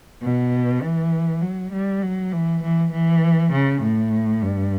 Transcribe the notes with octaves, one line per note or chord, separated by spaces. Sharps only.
B2
E3
F#3
G3
F#3
E3
E3
E3
C#3
A2
G2